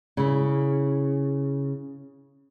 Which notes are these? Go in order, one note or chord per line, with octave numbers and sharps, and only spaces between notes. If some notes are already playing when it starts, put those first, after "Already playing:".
C#3 E4